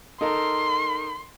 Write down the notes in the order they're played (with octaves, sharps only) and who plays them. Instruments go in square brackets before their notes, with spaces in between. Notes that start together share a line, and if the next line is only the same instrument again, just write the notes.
[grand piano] D#4 A4 A#4 [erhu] C6